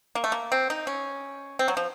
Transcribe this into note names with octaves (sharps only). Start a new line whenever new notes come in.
A#3
A3
A#3
C4
D#4
C#4
C4
F#3
F3